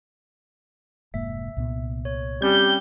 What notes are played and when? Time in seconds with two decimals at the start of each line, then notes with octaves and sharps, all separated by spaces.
1.14 F1 G#2 A#3 E5
1.57 C2 A#2 B3
2.05 C#5
2.42 G3 C4 C#4 G4 G6